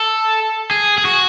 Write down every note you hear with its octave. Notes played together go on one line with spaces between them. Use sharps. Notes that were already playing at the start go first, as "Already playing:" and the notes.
Already playing: A4
G#4
G#4
F#4